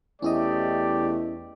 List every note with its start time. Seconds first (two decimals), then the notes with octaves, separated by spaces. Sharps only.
0.22 E2 A3 C#4 E4 G4 D5 D#5